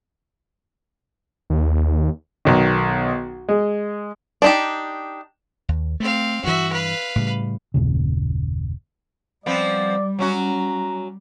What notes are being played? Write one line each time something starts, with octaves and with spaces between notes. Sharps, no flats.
D#2
B1 D#3
G#3
D4 D#4 G4
D#2
A3 C4 F5
G2 E3 F#4 E5
B4 F5
A2 C#3 G3
F#1 D#2 A#2 C#3
F3 G3 B3 C4 D5
F#3 C#4 F#4 A#5